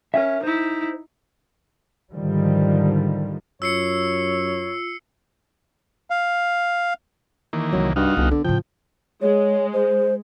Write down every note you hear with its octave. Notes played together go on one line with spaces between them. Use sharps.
C#4 A#4 C#5 E5
D#4 E4 C5
G#2 D3 D#3 F3 G3
F#2 F4 C#5 E6 C7 C#7
F5
D#3 E3 A#3
C2 F#3
G2 D#4 F#4 F5
G1 C2
D3 B3
A2 C#3 F3 G5
G#3 C#5
C5